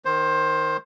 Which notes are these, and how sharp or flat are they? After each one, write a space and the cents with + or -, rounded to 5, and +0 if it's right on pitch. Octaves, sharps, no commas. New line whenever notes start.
D#3 +0 C5 +15